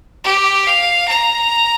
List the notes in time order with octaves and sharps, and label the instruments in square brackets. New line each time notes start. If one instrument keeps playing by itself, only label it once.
[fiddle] G4
F5
A#5